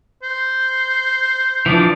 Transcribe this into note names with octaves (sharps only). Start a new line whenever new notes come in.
C5
E3 F3 D4